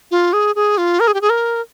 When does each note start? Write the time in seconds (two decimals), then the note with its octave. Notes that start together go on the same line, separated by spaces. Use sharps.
0.11 F4
0.33 G#4
0.56 G#4
0.78 F4
1.00 A#4
1.08 G#4
1.14 G4
1.21 G#4
1.30 A#4